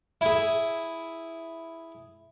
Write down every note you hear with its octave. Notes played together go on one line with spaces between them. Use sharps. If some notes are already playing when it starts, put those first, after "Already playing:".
E4 G#4